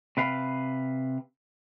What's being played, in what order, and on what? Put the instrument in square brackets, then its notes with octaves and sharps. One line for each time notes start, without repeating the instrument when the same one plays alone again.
[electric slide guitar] C3 B4 F5